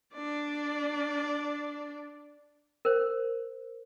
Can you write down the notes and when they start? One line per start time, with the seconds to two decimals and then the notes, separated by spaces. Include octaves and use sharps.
0.14 D4 D5
2.85 A#4 C5